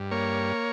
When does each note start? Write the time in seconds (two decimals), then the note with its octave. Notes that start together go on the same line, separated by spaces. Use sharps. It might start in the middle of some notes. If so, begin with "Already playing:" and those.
Already playing: G2
0.11 A#3 C#5